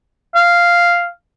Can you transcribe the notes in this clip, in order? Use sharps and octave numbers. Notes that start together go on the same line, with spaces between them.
F5